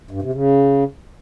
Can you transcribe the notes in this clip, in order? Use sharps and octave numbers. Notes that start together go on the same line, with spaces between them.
G2
C3
C#3